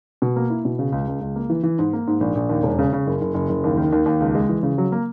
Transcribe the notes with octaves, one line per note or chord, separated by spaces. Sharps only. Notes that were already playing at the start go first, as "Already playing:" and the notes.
B2
A#3
E4
B2
C#3
C#2
C#2
C#2
A#3
E3
E3
G#2
A#3
G#2
A#1
A#1
D#2
E1
C#3
C#3
F#1
F#1
F#1
F#1
D#2
D#3
D#2
D#2
C#2
G#3
E3
C#3
F#3
A#3